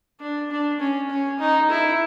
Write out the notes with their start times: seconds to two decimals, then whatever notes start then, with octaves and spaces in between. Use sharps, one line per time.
0.20 D4
0.51 D4
0.80 C#4
1.10 C#4
1.39 D#4
1.70 E4